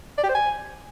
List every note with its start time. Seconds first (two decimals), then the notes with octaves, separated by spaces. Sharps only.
0.18 D5
0.24 G4
0.29 C5
0.35 G#5